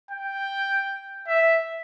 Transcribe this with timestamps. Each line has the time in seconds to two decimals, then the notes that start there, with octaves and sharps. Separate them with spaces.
0.11 G5
1.28 E5